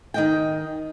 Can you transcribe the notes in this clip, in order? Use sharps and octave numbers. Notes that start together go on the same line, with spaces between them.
D#3 D#5 G5